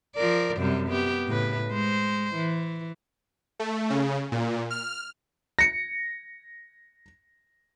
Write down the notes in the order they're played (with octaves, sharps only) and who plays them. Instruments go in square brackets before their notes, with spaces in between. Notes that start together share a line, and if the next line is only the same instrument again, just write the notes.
[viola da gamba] F3 A#4 D5
F#2 C3 G3
B3 G4
A2 C#3 B4
G#3 C5
E3
[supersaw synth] A3
C#3
A#2
F6
[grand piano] A#6 C#7